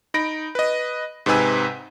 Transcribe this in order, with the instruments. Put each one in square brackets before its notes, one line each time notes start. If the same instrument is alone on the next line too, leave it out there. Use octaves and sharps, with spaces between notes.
[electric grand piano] D#4 B5 A#6 D7
B4 D#5
G#2 C3 D#4 B4 G#5 E6